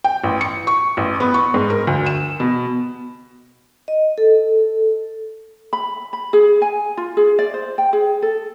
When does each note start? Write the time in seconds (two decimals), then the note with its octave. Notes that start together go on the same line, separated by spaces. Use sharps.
0.04 G5
0.24 A1
0.41 C#7
0.67 C#6
0.97 A1
1.20 B3
1.34 C#6
1.54 G#2
1.70 A#4
1.87 D2
2.06 E7
2.40 B2
3.88 D#5
4.18 A4
5.73 B5
6.13 B5
6.33 G#4
6.62 G#5
6.97 F4
7.17 G#4
7.39 D5
7.54 C5
7.78 G5
7.93 G#4
8.22 A4